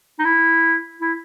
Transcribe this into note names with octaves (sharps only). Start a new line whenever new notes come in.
D#4
E4
E4